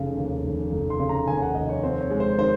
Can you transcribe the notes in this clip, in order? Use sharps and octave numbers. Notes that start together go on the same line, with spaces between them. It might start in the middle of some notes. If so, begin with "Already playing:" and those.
Already playing: F1 C#3
D#2
F1
F1
C6
C#3
A#5
D#2 G#5
F#5
F1 D#5
C#5
C4 C5
C#5
G#3
C5
D#3 C5